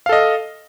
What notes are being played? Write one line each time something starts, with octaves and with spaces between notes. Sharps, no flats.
A4 D#5 F5